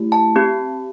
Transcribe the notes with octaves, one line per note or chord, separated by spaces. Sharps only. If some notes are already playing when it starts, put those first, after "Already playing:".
Already playing: A3 E4 G4
A5
C4 G4